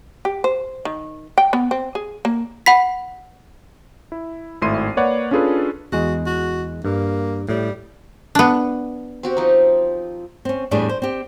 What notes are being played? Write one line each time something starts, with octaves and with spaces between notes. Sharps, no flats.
G4
C5
D#3
G5
B3
C4
G#4
A#3
F#5 B5 B6
E4
G#1 A2 E4 C6 C7 D#7
A#3 B4 C#5 D5 F#5
C#4 D4 F4 G#4 A4 B4
E2 G#3 F#4
F#4
G2 A#3
A2 G3
B3 D4
C4 F#4 G4
F3 D#4
C4 C#4
E2 A2 G3 D4 G#4
C5
C4 G4